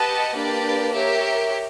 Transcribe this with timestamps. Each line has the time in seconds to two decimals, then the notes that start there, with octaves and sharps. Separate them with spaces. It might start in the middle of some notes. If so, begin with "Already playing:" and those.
Already playing: G4 B4 D#5 F#5 A5
0.36 A#3 D4 G4 B4 D5
0.94 G4 A#4 C#5 E5